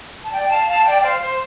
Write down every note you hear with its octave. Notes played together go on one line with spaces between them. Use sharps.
A5
D5 G5
F5 A5
F5 A5
D5 G5
C5 F5
C5